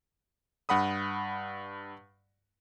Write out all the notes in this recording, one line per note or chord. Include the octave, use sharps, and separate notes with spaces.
G2 F#5 B5 D#6